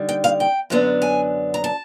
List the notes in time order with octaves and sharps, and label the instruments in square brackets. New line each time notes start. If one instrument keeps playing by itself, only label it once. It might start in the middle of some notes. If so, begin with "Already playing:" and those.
Already playing: [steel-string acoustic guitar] D3 G3 D#4
G5
F5
G5
F#2 D3 F#3 B3 D4
G#5
A#5
A5